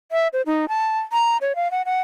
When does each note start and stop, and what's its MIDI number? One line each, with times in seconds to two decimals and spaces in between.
0.12 0.28 76
0.33 0.42 72
0.46 0.66 63
0.69 0.99 81
1.13 1.37 82
1.41 1.55 73
1.56 1.70 77
1.71 1.82 78
1.86 2.02 78